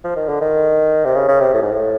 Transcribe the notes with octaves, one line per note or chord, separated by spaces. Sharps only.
F3
D#3
D3
D#3
C3
C#3
C#3
C3
A2
G#2
A2